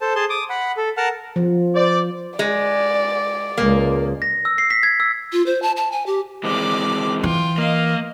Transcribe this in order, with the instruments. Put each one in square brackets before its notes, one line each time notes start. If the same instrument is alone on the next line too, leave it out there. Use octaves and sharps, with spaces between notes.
[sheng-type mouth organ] A4 C5 A5
G#4 A5 C6
D6 D#6
F#5 B5
A4
A#4 F#5 A5 F6
[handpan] F3
[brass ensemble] C5 D5
[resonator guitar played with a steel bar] G#3 [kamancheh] D5
[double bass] C#2 G#3 [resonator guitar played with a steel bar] A#3
[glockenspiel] A#6
E6
C7
B6
G#6
E6
[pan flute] F4
C5
A5
A5
G#5
G4
[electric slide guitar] E3 G#3 C4 [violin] D5 D6
[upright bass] E3 [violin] F4 G5
[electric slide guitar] A#3 [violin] D#5 F5